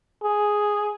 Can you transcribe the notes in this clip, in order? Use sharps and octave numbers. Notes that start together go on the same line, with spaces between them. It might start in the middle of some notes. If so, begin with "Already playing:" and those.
G#4